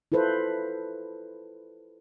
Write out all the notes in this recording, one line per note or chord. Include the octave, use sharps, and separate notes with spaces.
E4 F4 A4 B4 C5